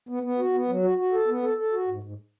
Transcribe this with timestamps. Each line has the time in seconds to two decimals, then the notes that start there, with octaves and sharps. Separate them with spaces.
0.09 B3
0.23 B3
0.39 F#4
0.54 B3
0.68 F#3
0.83 F#4
0.98 F#4
1.12 A4
1.28 B3
1.43 A4
1.58 A4
1.72 F#4
1.88 G#2
2.03 G#2